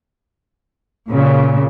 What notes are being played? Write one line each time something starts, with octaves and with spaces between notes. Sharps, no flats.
A#2 C#3